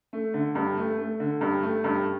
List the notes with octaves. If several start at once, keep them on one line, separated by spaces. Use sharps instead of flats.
A3
D3
G2
A3
A3
D3
G2
A3
G2